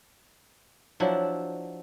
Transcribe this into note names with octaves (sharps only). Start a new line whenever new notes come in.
F3 F#3 D4 E4